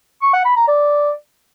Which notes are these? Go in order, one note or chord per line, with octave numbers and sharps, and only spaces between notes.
C#6
F#5
B5
A#5
D5